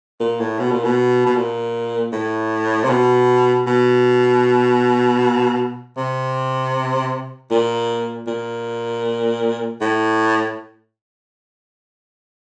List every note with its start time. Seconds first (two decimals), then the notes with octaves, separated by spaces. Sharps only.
0.20 A#2
0.40 A2
0.59 B2
0.71 A#2
0.84 B2
1.26 B2
1.36 A#2
2.13 A2
2.83 C3
2.89 B2
3.67 B2
5.97 C3
7.50 A#2
8.27 A#2
9.81 A2